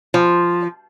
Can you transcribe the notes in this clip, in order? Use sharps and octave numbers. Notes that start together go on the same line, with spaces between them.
F3